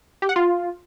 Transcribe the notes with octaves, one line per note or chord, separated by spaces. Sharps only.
G4
F#5
F4